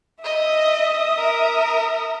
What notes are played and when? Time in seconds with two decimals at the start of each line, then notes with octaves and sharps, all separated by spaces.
0.24 D#5 E5 D#6
1.18 A#4